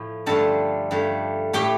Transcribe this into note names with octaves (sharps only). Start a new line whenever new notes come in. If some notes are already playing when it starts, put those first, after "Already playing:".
Already playing: A2 F3
G2 D3 F3 A3 A4 A5
G2 F3 A3
A2 A3 G4 G5